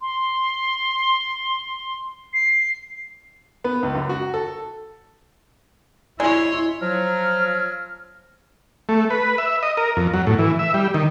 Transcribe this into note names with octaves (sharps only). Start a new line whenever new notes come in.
C6
C7
B3
C#2
F#2
F#4
A4
G#3 E4 C#5 D5 C6
F3 F#3 F6
A3
B4
E5
D#5
A#4
F2
F#3
A2
E3
E5
G3
D#3